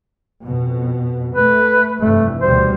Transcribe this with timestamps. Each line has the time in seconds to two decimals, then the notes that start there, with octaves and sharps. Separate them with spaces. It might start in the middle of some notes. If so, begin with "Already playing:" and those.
0.42 F2 B2
1.35 A3 B4
2.01 F1 G2 E3 A3
2.41 D2 B2 G3 C5